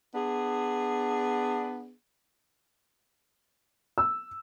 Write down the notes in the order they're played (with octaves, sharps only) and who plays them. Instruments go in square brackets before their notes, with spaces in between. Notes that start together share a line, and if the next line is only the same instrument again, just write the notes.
[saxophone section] B3 D4 G#4
[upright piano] E6